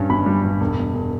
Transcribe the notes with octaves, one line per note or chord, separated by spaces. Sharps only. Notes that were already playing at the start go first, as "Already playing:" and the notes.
Already playing: G2 G3 C#4
G1 B5
G3
G2
E1
E1
E1